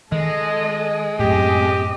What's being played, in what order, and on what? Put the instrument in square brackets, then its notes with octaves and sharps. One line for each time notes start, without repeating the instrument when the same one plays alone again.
[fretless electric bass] D#3 [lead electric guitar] G#3 [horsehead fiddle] A4 D#5
[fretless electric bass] F#2 A2 [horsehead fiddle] C4 D#5 [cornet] G4